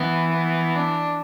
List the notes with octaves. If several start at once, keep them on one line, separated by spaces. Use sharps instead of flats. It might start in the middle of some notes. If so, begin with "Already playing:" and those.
Already playing: E3 B3
B3
D4